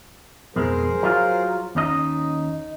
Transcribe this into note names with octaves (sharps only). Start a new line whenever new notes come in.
B1 F2 G#3 G#4 A#4 C5
F#3 F4
D#2 C#4 D#4 D#5